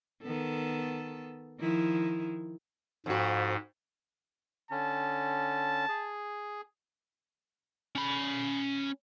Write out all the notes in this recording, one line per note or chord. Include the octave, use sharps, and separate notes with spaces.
D#3 B3 A4
D#3 F3 E4
F2 G#2 F#4
D3 C#4 A5
G#4
C#4 B5